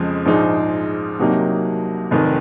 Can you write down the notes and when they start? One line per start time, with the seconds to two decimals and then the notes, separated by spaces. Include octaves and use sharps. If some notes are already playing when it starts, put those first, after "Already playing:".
Already playing: F2 C#3 F3 G#3
0.26 A#1 G#2 F3 G#3 D#4
1.19 C2 C3 F#3 A#3 D#4
2.11 F1 F2 D#3